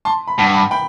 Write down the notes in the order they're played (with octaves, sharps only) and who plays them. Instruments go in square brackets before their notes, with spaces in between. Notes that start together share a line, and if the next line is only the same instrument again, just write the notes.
[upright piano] A5 C6
B5
[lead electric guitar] G2 [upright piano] F#5 A5
[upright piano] G5 B5
G5 B5